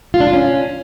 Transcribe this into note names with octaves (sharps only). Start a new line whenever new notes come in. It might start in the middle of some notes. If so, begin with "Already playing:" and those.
F4
D4
F4
C#4